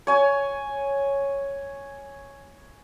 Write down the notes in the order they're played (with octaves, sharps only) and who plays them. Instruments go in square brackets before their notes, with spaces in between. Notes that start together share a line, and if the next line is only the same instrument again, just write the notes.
[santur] C#5 G#5